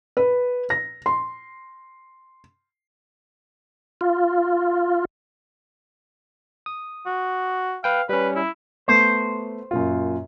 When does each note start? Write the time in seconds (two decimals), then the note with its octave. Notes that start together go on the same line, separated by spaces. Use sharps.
0.17 B4
0.70 A#6
1.06 C6
4.01 F4
6.66 D#6
7.06 F#4
7.84 B4 F5 G5
8.09 G3 C#4 B4
8.36 E4
8.88 A3 B3 C5
9.71 F#2 A#2 F4